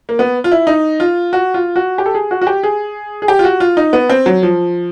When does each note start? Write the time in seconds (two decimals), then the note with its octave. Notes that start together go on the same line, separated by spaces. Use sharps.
0.09 A#3
0.19 B3
0.44 F4
0.52 E4
0.67 D#4
1.00 F4
1.33 F#4
1.54 F4
1.76 F#4
1.98 G4
2.06 A4
2.15 G#4
2.31 F#4
2.42 F#4
2.47 G4
2.63 G#4
3.22 G#4
3.28 G4
3.39 F4
3.44 F#4
3.60 F4
3.77 D#4
3.93 B3
4.10 C4
4.26 F#3
4.43 F3